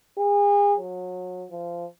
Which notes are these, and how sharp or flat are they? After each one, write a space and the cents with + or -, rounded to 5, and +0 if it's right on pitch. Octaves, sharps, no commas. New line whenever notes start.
G#4 -35
F#3 -30
F3 -20